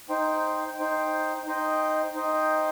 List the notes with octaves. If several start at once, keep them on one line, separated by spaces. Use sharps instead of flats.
D#4 C5 G5
D#4 C5 G5
D#4 C5 D#5 G5
D#4 C5 D#5 G5